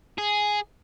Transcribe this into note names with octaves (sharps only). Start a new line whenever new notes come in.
G#4